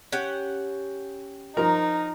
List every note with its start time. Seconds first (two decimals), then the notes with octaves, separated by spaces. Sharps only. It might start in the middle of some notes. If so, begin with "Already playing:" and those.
0.12 C#4 G4 F#5
1.57 F3 D#4 A#4 A#5